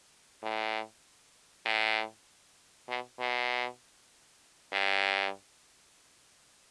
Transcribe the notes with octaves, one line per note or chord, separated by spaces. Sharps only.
A2
A2
B2
B2
G2